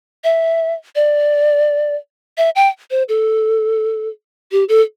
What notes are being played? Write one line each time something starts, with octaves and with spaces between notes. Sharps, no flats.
E5
D5
E5
G5
C5
A4
G4
A4